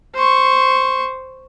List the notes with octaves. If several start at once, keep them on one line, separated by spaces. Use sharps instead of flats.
C5 C#6